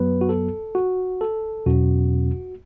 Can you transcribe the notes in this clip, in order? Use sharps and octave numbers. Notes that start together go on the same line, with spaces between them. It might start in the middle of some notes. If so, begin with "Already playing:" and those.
Already playing: F#2 F#3 B3 B4
F#4
A4
F#4
A4
E2 B2 F#3 C#4 F#4